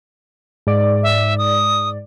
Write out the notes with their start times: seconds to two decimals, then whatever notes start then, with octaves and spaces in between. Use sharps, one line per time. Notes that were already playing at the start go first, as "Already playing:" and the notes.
0.67 G#2 D5
1.03 E5
1.38 D#6